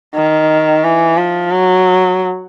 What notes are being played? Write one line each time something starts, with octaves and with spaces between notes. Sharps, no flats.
D#3
E3
F3
F#3